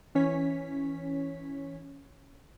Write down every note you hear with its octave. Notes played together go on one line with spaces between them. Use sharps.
E3 C#4 C#5 B6